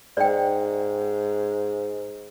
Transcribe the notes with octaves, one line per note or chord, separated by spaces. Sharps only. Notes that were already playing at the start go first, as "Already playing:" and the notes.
G#2 D5 G5